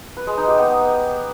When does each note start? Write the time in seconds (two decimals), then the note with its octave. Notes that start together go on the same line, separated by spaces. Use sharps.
0.17 B4
0.27 G#3
0.38 D#4
0.48 G4
0.58 B3